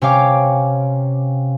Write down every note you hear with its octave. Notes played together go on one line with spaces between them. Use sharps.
C3 C#4 C#5 F5 G5 D6